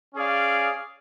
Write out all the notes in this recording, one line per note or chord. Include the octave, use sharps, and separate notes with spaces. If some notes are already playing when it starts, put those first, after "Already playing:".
C#4 G#4 D5 F5